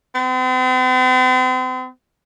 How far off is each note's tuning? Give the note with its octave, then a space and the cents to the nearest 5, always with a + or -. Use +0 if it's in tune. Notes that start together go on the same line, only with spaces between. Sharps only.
C4 -45